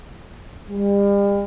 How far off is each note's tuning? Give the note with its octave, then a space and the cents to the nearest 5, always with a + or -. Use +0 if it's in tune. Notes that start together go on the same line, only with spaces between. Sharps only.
G3 +40